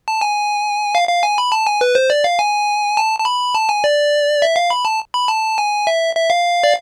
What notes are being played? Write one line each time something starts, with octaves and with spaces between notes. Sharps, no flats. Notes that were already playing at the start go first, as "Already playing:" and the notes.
A5
G#5
F5
F5
G#5
B5
A5
G#5
B4
C5
D5
F5
G#5
A5
A5
B5
A5
G#5
D5
E5
F5
B5
A5
B5
A5
G#5
E5
E5
F5
D5